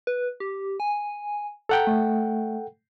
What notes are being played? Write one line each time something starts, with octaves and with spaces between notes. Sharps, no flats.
B4
G4
G#5
A4 F#5 G5 A#5
A3